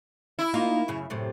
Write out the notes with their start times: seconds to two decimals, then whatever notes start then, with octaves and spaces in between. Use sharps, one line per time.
0.39 E4
0.54 A#3 D#4 F4
0.88 F#2 C#3
1.10 F#2 A2 C3